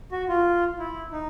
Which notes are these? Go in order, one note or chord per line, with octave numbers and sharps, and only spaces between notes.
F#4
F4
E4
D#4